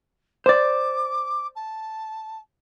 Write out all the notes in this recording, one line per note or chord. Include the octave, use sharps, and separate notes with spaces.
C5 D5 D6
A5